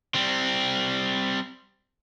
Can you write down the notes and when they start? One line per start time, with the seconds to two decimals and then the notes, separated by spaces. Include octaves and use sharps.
0.15 G3 C4